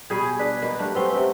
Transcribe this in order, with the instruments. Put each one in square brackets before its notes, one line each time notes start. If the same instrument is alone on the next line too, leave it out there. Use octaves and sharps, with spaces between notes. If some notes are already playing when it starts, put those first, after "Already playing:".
[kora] B2 G3 [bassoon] G#4 [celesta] B5 G#6
[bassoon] D4 [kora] B4 [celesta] B6
[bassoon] B2 [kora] A#3 B4
[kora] G3 A3 D4
[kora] G3 A3 C#4 [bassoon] C4 [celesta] B4 F#5 G7
[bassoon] C3